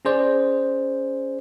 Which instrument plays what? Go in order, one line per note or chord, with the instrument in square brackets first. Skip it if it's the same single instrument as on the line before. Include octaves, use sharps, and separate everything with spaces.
[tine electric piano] C#4 G#4 C5 D5